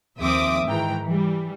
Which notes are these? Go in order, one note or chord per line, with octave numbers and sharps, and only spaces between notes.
D#2 F3 C4 E5 D6 D#6
G#2 D#3 E3 G#3 G5 A#5
E3 G3